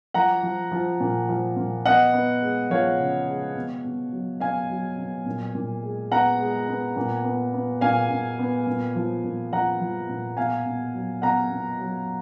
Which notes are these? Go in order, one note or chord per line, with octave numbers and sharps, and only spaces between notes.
F3 F#5 A#5
F3
F3
A#2
F3
A#2
B3 D#5 F#5
B3
G#3
F3 C#5 F5
C#3
G#3
B2
B2
F#3
B2 F5 G#5
F#3
B2
A#2
A#2
G#3
B3 F#5 A#5
G#3
B3
A#2
B3
B3
A#2 F5 G#5
A#2
B3
A#2
F3
A#2
F3 F#5 A#5
F3
A#2
B2 F5 G#5
B2
F#3
B2 F#5 A#5
B2
F#3